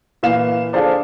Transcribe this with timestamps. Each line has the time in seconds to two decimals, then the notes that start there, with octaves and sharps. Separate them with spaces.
0.23 A#2 E3 F5 E7
0.73 D4 F4 G#4 A4 C5 D5